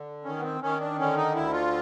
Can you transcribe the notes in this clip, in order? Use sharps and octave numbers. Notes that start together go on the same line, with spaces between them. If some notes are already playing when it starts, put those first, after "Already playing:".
Already playing: D3
D#3 C#4
B3
C4
D#3 C#4
D4
D3 C#4
D#4
D2 E4
F4